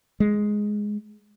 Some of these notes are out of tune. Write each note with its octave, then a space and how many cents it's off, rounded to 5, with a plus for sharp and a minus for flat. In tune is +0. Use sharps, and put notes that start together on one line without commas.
G#3 +5